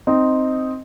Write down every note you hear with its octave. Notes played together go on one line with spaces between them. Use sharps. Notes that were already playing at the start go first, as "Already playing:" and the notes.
C4 D#4